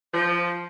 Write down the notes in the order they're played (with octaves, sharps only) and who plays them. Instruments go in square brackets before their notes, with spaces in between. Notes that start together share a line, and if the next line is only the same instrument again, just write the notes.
[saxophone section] F3